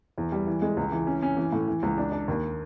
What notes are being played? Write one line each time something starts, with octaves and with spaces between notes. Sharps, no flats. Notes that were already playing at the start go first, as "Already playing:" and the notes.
E2
G3
E3
G#3
C#2
E3
C#4
C#4
E3
A2
E3
C#2
D4
D4
D#2